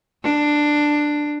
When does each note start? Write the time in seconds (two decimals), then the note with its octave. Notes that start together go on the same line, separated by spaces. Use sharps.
0.24 D4